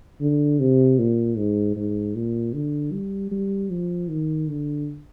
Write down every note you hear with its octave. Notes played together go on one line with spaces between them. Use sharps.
D3
C3
A#2
G#2
G#2
A#2
D3
G3
G3
F3
D#3
D3